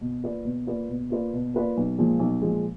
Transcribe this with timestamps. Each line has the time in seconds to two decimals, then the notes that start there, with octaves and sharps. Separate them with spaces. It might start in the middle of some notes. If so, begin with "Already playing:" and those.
0.01 B2
0.24 A#3 F4 B4 D5
0.45 B2
0.66 A#3 F4 B4 D5
0.89 B2
1.10 A#3 F4 B4 D5
1.33 B2
1.54 A#3 F4 B4 D5
1.77 B1
1.98 A#2 F3 G#3
2.19 B1
2.42 A#2 F3 G#3